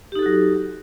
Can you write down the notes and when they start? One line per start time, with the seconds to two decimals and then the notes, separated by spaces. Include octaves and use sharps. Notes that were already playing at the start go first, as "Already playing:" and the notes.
0.12 G4
0.15 D#4
0.19 A4
0.22 F#4
0.26 F#3